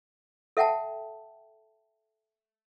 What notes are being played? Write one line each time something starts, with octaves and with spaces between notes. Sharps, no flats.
A4 E5 F#5 G5 A5